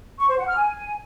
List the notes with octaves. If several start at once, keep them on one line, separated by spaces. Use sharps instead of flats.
C#6
C5
F#5
F6
G#5